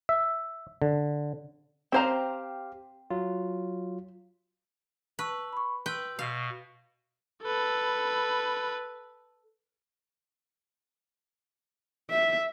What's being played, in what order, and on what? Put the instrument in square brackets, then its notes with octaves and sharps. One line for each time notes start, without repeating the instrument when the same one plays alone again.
[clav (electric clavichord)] E5
D3
[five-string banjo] C4 C5 A#5 [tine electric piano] G4 F5
[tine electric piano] F#3 F4
[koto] B4 [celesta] A5 C#6 E6
[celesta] B5 C#6
[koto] B4 G5 [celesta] C6 E6
[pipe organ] B2 [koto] F5
[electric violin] A4 B4
[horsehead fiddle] E5